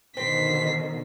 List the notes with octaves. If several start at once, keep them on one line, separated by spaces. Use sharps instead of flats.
B2 D3 D#3 C4 C5 B6 C7